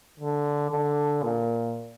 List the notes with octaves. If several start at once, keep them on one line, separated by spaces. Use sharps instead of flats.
D3
D3
A#2